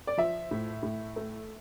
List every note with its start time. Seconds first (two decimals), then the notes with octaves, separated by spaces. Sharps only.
0.07 D5
0.18 F3 E5
0.51 A2
0.83 A2
1.16 A3